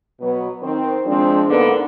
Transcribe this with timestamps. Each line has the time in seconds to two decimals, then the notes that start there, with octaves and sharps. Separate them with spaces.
0.20 B2 F#3 B3
0.63 D#3 C4
1.06 F3 G#3 C4 D4
1.48 G#2 D3 D#3 A#3 B3